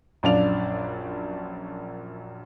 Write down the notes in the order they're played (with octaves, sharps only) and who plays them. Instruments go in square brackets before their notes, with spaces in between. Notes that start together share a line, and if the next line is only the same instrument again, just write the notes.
[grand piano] A#1 F#2 D4 D5 F5 F7